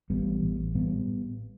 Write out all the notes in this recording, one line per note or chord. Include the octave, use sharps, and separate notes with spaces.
A1 G3 B3
A1
A2 G3 B3